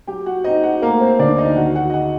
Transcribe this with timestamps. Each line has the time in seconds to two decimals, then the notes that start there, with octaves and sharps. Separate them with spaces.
0.07 F#3 G4 G5
0.26 F#4 F#5
0.44 C4 D#4 D#5
0.63 F#4 F#5
0.82 A3 A#3 A#4
1.00 C4 C5
1.19 D2 D4 D5
1.38 D#4 D#5
1.56 D#3 F#4 F#5
1.76 F#4 F#5
1.90 D#5
1.94 F#4 F#5